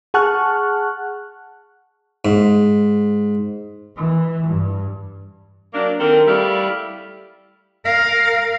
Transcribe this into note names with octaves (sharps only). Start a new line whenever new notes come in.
G#4 F#5 A5 C#6 F6 F#6
G#2
E3
G2
F#3 A#3 D4
D#3 C4 A4 A#4
G3 A3 E4 D5 F5
A#4 F5